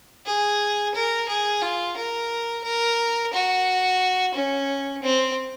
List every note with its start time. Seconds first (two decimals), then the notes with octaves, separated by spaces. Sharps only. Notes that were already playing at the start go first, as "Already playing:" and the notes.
0.26 G#4
0.94 A#4
1.29 G#4
1.62 F4
1.97 A#4
2.64 A#4
3.33 F#4
4.34 C#4
5.02 C4